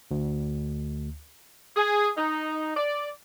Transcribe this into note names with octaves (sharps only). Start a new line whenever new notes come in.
D2
G#4
D#4
D5